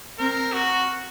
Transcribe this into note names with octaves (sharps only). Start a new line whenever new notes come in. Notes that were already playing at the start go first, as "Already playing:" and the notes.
C4 A#4
F#4